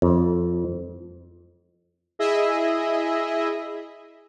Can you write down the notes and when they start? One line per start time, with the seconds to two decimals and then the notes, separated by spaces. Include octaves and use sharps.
0.02 F2
2.19 E4 G#4 D#5 E5